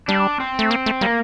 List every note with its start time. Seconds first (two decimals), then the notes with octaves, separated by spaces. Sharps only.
0.08 G3 D4
0.40 C4
0.59 A3
0.71 A#3
0.86 A3
1.01 G3 A#3